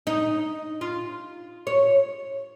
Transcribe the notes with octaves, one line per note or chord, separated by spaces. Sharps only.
D#4
F4
C#5